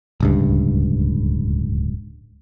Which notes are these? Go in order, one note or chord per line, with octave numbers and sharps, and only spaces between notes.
D1 C#2 G2